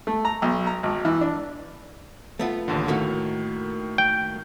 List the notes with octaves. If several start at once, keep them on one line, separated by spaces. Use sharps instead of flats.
A3
A#5
B1
A#5
G#1
E3
D4
A3 B3 F4
A1 D#2 D3
A2 D#3 A3 A#3 F#4
G5